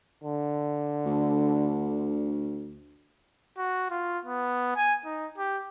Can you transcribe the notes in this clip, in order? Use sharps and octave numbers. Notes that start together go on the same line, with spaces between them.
D3
D2
F#4
F4
B3
G#5
D#4
G4